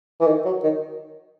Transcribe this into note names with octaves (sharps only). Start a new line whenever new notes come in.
E3
D#3
F#3
D#3